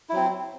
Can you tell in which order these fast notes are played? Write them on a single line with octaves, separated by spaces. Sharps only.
E4 F#3 C4